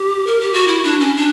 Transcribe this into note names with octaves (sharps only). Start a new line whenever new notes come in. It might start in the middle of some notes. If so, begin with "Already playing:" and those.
Already playing: G4
A#4
G4
F#4
E4
D4
C#4
D4